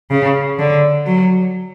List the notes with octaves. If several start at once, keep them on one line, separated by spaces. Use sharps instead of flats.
C#3
D3
F#3